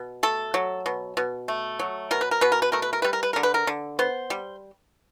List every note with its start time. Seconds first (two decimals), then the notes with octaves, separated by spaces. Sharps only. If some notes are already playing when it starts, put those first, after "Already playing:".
Already playing: B2
0.23 A3 A4
0.54 F#3
0.86 B2
1.17 B2
1.48 A3
1.79 F#3
2.11 B2 A#4
2.21 B4
2.31 A#4
2.41 B2 B4
2.52 A#4
2.62 B4
2.72 A3 A#4
2.82 B4
2.93 A#4
3.02 G3 B4
3.13 A#4
3.23 B4
3.33 D3 A#4
3.43 B4
3.54 A#4
3.67 D3
3.99 B3 C5
4.30 G3